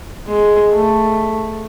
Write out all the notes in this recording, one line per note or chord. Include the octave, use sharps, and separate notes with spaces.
G#3
A3